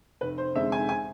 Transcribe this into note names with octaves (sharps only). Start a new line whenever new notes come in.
F1 B4
C5
F2 D3 G#3 E5
G#5
G#5